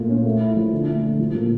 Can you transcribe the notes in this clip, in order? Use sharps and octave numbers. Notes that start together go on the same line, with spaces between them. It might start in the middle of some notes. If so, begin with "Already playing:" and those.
Already playing: A#2 A3 F4
C#4
A3
E4
F3
D3
A3
D3
F3
A#2